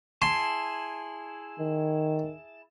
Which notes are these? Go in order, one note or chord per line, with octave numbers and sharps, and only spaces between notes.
E4 G#4 A5 C6
D#3